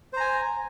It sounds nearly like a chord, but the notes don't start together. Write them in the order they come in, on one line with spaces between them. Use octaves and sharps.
C5 A#5 G#5